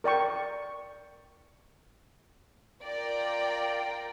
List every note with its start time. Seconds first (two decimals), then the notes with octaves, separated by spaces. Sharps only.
0.04 A#4 D5 G5 C#6
2.83 F4 A#4 D5 G5 A#5